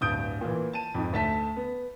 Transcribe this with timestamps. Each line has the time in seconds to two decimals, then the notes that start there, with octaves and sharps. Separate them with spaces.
0.01 D1 G2 D#6 G6 D7
0.41 A#2 E3
0.73 A5 D#7
0.94 F2 G#2
1.13 D2 A3 A5 B6
1.57 B3